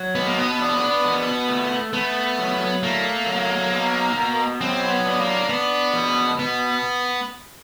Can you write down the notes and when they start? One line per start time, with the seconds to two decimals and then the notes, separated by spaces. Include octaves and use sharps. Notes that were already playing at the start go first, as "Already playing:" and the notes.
Already playing: F#3
0.15 B2 B3
0.27 A#3
0.37 B3
0.59 D4
1.05 B2
1.48 A3
1.93 A3 B3
2.38 F#3
2.83 A3 A#3
3.26 F#3
3.71 B2
4.16 B2
4.60 F#3 C4
4.90 B3
5.05 D4
5.20 A#3
5.49 B3 D4
5.94 B2
6.38 B2 B3